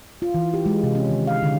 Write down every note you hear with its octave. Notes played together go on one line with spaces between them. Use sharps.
F4
E3
G4
G#3
C3
C#4
D#3
F5
D3